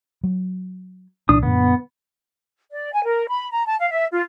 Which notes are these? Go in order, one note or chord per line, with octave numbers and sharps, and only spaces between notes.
F#3
C2 A#2 E3 D4 D#6
F#2 A#2 D3 B3
D5
G#5
A#4
B5
A#5
A5
F5
E5
F4